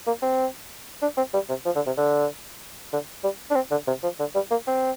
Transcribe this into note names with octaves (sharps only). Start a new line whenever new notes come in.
A#3
C4
D4
C4
G3
C3
F3
D3
C3
D3
D3
G3
D4
C4
D3
C3
F3
D3
G3
A#3
C4